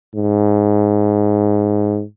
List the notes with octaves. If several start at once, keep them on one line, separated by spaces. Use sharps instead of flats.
G#2